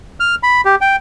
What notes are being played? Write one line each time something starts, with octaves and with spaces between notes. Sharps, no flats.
F6
B5
G4
G5